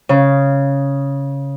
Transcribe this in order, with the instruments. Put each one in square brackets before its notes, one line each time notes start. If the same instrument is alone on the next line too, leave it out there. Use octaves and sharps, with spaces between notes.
[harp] C#3